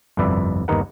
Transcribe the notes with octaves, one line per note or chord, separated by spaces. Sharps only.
G1 C2 F2 B4 D5 E5
G1 D#2 B3 D#4 A#4 F#5